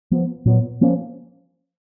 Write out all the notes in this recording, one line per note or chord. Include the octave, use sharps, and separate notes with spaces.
F3 B3
A#2 F#3 B3
F3 A#3 C#4